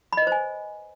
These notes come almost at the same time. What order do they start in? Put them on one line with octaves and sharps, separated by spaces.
B5 D#5 B4 C5 G#5